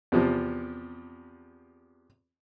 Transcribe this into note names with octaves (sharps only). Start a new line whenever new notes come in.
E2 C3 F3